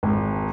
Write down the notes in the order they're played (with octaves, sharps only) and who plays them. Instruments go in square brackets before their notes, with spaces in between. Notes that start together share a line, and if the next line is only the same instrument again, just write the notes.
[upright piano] G#1